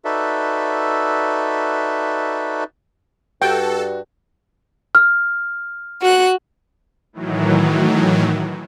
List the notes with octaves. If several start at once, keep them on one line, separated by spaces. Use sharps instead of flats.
D#4 F#4 A4 B4 D5 E5
G2 F#4 A4 G5
F6
F#4 F#6
A2 D#3 E3 F#3